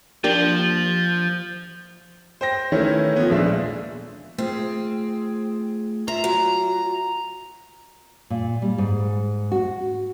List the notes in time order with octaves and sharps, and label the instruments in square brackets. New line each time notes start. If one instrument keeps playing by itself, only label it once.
[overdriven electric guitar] F3 [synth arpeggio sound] A#3 D4 G4
[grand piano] C5 G5 A#6
D#3 E3 A3 C#4 E4
F3 B3
A#1 G#3 D4 E5
[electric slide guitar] A3 F4 G#4 [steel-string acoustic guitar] C4
[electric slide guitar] F4 [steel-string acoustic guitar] E5 [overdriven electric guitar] A#5
[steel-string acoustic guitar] F#3
[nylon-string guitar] A#2
G3
G#2
F#4